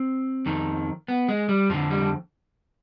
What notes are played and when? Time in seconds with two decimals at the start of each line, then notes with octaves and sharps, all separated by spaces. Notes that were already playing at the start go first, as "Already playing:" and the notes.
Already playing: C4
0.46 F2 D#3
1.08 B3
1.29 G#3
1.49 G3
1.70 F2 D3 F3
1.91 G3